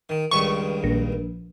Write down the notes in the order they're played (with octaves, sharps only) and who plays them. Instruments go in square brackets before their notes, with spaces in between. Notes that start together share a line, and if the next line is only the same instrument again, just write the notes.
[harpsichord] D#3
[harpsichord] C#2 G2 D#3 [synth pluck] C#6
[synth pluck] A#1